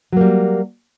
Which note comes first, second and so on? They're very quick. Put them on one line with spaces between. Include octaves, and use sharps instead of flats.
F#3 A#3 G3